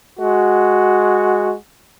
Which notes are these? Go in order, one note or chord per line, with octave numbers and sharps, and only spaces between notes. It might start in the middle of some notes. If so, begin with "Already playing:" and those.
G#3 F#4